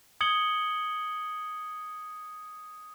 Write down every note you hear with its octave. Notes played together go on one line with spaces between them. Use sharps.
D#6 G#6 C#7 F#7 G7